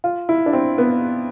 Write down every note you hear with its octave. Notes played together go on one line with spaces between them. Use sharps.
F4
E4
D4
C4
B3